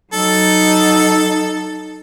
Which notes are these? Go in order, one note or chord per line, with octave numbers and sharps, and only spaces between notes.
F#3 D#4 A4